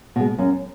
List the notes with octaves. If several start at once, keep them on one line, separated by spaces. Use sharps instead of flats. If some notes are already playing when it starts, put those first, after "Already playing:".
B2 G#3
F#2